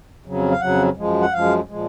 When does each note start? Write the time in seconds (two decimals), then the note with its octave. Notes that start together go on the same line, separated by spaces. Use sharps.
0.25 F2 C#3 F#3
0.51 F5
0.61 F2 C#3 F#3 F#5
0.97 F#2 F3 G#3
1.21 F#5
1.32 F#2 F3 G#3 F5
1.68 A#2 F3 G#3